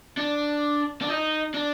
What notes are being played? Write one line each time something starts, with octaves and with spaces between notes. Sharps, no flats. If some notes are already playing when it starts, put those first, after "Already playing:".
D4
D4
D#4
D4